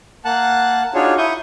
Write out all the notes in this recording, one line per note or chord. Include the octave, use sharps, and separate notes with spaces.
A#3 F#5 A5 F#6
D4 D#4 F4 F#4 G#4 C#5
E4 C#6 D#6 G6